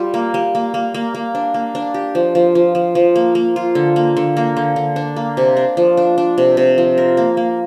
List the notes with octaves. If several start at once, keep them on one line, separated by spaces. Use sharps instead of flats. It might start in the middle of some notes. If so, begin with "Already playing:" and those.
Already playing: G3 F4
A#3
G3
A#3
A#3
A#3
A#3
D4
A#3
D4
G4
F3
F3
F3
F3
F3
A#3
A#3
F4
D3
A#3
D3
A#3
D3
D3
D4
A#3
C3
D4
F3
D4
D4
C3
C3
F3
A#4
A#3
A#3